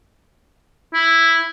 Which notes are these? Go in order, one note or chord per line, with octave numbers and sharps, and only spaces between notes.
E4